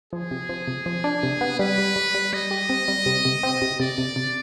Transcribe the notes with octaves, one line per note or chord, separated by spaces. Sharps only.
F3 G#4
C3
F3
C3
F3
D4
C3
B3
G3 B4
G3
G3
G3
G3 D#5
G4
C4
G3
C3
C3
C4
C3
C3 D5
C3
C3